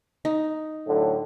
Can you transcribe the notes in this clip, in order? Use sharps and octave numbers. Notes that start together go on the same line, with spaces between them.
D#4
A2 D3 F#3